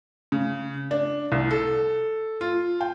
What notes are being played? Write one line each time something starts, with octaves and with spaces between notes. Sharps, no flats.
C#3
D4
C2
A4
F4
G5